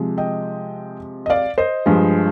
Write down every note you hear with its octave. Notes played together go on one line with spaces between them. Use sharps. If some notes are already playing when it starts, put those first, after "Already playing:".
Already playing: C3 F3 G#3
D#5 G5
D#5
D5 F5
C5 D#5
G2 F3 G#3